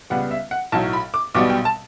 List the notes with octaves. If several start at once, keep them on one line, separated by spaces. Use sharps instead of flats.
C#2 C#3 G3 B3 F#5
E5
F#5
B1 A2 F#3 A5
B5
D6
B1 B2 G3 B3 D6
G5
A5